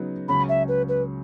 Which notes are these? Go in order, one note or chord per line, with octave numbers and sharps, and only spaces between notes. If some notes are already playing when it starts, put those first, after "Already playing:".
Already playing: C#3 F#3 B3 D#4 F#4
C#2 C#3 F#3 C#4 B5
E5
B4
B4